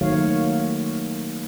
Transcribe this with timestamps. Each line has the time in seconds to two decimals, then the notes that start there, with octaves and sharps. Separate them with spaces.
0.01 D#3 F#3 A3 A#3 C#5 F5